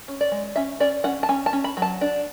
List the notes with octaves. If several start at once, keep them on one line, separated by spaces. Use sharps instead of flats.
C#4
D5
G#3
C#4 E5
C#4 D5
C#4 F#5
A5
C#4 G#5
A5
C#4
B5
F#3
A5
D4